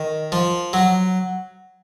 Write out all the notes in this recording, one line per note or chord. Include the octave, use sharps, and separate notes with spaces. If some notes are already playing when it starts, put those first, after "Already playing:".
Already playing: D#3
F3
F#3